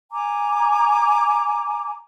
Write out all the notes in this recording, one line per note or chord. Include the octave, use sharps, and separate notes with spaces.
G#5 A#5 D6